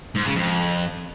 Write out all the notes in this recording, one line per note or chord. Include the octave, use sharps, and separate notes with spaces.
G#2
C#3
F2